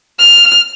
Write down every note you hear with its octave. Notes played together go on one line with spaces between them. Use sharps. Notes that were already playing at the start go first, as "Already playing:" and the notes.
F6